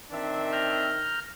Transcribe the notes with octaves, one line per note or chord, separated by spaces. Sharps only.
D#3 C4 D4 E5
A#5 F6 G6